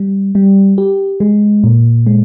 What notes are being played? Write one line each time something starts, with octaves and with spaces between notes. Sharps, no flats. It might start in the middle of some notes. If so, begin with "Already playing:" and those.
Already playing: G3
G3
G4
G#3
A#2
G#3